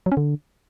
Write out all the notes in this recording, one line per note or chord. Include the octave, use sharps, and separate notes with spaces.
F#3
C#4
D3